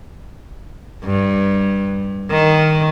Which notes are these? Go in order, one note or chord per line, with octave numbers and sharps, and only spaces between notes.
G2
D#3